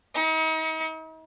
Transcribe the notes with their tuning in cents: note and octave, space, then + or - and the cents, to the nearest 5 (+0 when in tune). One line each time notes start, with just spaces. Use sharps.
D#4 +40